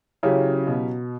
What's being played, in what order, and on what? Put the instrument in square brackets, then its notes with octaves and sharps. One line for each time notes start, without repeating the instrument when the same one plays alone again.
[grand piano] C#3 [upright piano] F#3 C#4 E4 G4
[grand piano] B2